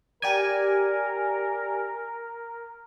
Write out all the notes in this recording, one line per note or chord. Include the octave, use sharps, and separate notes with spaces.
G4 A#4 D5 G#5